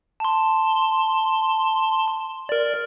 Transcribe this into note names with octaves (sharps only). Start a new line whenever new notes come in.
A5 C6
A#4 D5